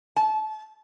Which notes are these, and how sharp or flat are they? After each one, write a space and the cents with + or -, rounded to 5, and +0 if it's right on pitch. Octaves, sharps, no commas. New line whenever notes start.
A5 -25